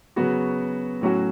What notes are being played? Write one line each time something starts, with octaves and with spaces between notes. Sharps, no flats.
C#3 F#3 B3 F#4
A2 F#3 C#4 F#4